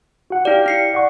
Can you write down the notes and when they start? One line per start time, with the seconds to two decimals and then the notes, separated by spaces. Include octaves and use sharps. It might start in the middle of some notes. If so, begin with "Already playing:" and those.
0.30 F#4 F#5
0.45 E4 G4 D5 F5 G5
0.66 E4 C7 C#7
0.93 D5 F#5 C#6